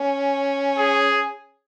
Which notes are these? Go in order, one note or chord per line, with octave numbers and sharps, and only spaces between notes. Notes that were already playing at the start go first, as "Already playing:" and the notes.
Already playing: C#4
G#4